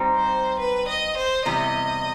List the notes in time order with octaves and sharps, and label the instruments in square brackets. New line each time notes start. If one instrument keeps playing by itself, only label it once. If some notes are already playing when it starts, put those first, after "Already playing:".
Already playing: [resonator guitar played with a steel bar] G3 C4 D#4
[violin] C5
B4
D#5
C5
[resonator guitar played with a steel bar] E2 C3 G3 [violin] D#5